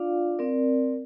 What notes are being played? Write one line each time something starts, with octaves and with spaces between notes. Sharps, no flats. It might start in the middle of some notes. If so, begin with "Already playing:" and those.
Already playing: D4 F4 D5 F5
C4 A#4 D5